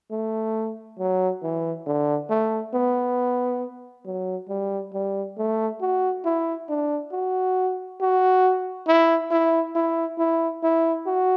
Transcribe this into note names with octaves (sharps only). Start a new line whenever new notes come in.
A3
F#3
E3
D3
A3
B3
F#3
G3
G3
A3
F#4
E4
D4
F#4
F#4
E4
E4
E4
E4
E4
F#4